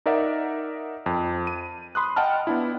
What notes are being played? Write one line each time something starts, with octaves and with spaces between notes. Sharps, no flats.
D#4 A#4 D5 E5 F#5
F2
D#7
B5 C6 D#6 F#6
D#5 F#5 G5 A5 F6
B3 D4 E4